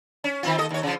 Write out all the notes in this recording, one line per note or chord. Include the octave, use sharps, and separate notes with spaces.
C#4
D#3 C4 F4
D#2 A4 D#5
D#2 C#5
C#3 F3